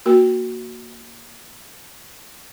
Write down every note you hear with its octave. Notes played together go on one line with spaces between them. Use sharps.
A#3 F#4 A#4